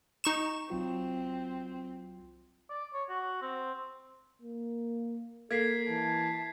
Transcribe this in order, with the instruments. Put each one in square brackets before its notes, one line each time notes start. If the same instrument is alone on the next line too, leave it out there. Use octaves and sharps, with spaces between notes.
[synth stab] D#4 C#6 E7
[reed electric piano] C2 F#3 F4 [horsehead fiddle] C4
[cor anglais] D5
C#5
F#4
C4
[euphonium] A#3
[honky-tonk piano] A#3 [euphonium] A4 [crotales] G#6 B6 C7
[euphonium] E3 [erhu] A5